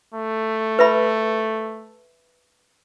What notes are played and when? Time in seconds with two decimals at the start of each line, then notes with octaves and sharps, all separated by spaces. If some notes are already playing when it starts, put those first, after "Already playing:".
0.14 A3
0.79 B4 E5 B5